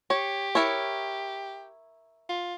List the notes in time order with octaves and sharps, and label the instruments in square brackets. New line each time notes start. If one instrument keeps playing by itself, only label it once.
[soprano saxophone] G4 [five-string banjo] C#5
[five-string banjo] E4 A#4 C#5
[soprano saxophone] F4